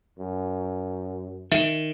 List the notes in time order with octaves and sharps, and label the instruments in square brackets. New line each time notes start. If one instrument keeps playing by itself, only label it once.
[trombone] F#2
[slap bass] D#3 [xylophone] E5